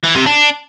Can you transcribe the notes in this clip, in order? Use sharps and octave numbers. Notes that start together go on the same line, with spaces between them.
E3
C3
D4